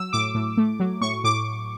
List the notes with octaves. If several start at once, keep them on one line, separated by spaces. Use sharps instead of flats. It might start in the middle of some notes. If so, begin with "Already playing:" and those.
Already playing: F#3 E6
A2 D6
A2
A3
F#3
A2 C#6
A2 D6